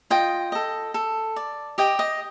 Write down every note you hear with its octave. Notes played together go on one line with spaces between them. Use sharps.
F4 D#5 G5
A4 D#5
A4
D5
G4 D#5 G5
D#5